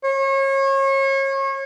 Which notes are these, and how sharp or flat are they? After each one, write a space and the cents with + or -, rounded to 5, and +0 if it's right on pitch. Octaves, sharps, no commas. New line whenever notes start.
C#5 -35